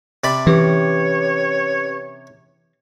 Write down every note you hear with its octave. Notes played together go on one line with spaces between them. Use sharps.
C3 D5 B5
E3 C#4 G4 B4 C#5